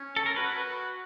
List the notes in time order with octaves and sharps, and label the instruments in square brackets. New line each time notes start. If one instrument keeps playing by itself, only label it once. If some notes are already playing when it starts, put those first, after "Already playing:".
Already playing: [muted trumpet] C#4
[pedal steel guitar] A4
A#4
[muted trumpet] F#4 [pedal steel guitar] B4